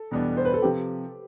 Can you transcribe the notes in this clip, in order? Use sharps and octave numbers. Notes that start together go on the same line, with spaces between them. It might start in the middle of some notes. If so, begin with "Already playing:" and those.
Already playing: A4
E2 B2 G3 B3 D4
C5
B4
A4
C3 F3 G4